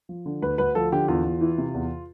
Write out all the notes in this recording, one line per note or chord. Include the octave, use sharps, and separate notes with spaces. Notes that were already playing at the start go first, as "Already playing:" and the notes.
F3
D3
D2 B4
D2 B4
F3 A4
D3 G4
E2 F4
E2
E3
C3
E2